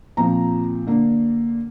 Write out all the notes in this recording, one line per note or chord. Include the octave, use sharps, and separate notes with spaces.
A#2 F3 C4 A#5
D3 A#3 D4